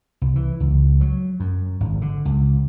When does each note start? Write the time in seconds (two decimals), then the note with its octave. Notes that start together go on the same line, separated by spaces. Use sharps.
0.21 C2
0.36 E3
0.60 C#2
1.01 F#3
1.40 F#2
1.80 G#1
2.02 D3
2.25 C#2